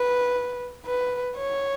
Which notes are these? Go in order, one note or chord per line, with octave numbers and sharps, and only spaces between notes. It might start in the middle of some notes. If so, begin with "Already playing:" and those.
Already playing: B4
B4
C#5